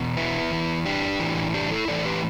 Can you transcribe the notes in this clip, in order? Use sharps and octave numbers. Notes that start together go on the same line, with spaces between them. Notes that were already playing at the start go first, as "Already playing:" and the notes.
Already playing: E2 B2
B3 E4
E2 E3
D4 G4
A2 E3
D4 G4
E4 A4
A2 E3 A4 D5
G4 B4